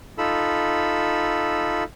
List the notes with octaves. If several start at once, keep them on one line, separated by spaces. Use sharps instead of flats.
D#4 F4 A4 B5 E6